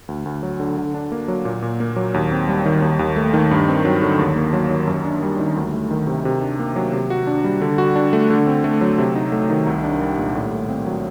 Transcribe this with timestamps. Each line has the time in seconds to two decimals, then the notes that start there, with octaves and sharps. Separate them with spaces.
0.08 D2
0.25 D2
0.43 F#3
0.60 D3
0.78 D3
0.94 D4
1.12 A#3
1.28 F#3
1.45 A#2
1.62 A#2
1.80 A#3
1.96 F#3
2.14 D#2
2.32 C4
2.48 G3
2.66 D#3
2.82 D#2
2.99 D#2
3.16 A3
3.33 D#3
3.51 G2
3.68 C4
3.85 F#3
4.02 D3
4.19 D#2
4.36 A#3
4.53 F#3
4.70 D#3
4.87 F#2
5.05 D4
5.23 G3
5.39 D#3
5.56 D2
5.74 A3
5.91 D#3
6.07 C3
6.25 C3
6.41 D4
6.59 A#3
6.76 F#3
6.93 C3
7.10 F#4
7.27 D4
7.44 G3
7.61 D3
7.78 F#4
7.96 D4
8.13 A3
8.30 D3
8.47 C4
8.64 A3
8.81 F#3
8.98 C3
9.16 D#4
9.32 A3
9.50 D#3
9.67 C2
9.83 D4
10.01 G3
10.18 A#2
10.35 A2
10.52 A2
10.69 C4
10.86 F#3